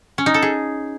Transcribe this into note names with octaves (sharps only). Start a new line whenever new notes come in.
C#4
D#4
A4
G#4